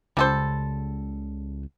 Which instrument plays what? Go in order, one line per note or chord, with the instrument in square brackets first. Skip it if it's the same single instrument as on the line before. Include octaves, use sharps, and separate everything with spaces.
[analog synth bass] C#2 [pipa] G3 A4 C5